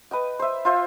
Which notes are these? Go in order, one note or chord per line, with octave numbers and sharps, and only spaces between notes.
B4 D#5 G5
C5 E5
F4 C5 E5